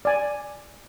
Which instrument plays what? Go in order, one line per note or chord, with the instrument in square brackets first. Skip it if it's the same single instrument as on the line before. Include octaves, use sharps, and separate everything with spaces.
[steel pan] D5 G#5